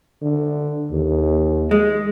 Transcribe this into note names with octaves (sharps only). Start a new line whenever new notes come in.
D3
D#2
G#3